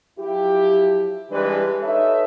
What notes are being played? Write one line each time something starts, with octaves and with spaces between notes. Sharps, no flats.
F3 F#3 E4 G4
E3 G3 G#3 D4 G4 B4
D#4 A4 B4 C#5 E5